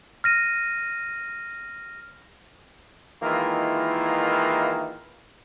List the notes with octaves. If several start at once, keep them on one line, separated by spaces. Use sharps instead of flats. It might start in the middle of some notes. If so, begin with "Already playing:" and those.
F6 A#6 D#7
D#3 E3 G#3 A#3 E4 F4